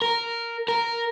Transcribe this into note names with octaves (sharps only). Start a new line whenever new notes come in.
A#4
A#4